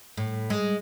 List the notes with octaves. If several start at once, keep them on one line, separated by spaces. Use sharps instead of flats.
A2
G#3